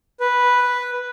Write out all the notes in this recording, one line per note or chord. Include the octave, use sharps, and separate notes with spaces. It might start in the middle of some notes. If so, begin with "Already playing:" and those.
B4